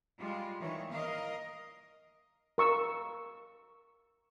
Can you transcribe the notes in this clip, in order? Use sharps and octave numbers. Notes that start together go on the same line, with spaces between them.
G3 G#3 F4
D#3 E3 C#5
A#4 D#5 F5
A#4 C#6 E6